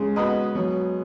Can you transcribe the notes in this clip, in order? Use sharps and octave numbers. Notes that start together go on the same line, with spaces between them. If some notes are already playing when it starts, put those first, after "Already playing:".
Already playing: C#3 G#3
B3 F#4 B4 D#5
B2 F#3